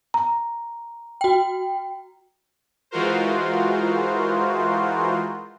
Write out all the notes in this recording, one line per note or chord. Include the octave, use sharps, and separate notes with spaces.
A#5
F#4 G5
E3 G#3 F4 F#4 A#4 C5